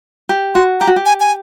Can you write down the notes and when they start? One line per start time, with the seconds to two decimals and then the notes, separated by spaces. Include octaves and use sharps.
0.29 G4
0.55 F#4 C6
0.80 G4 A#5
0.87 F#4
0.96 G4
1.05 G#5
1.20 G#5